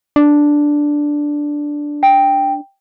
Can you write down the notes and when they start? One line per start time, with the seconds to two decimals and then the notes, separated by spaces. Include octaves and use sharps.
0.16 D4
2.03 G5